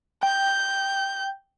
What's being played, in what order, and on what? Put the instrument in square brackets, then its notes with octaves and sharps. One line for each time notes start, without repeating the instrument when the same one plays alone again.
[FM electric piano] G5 [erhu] G6